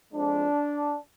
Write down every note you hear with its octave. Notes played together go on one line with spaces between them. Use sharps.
F2 F3 G#3 D4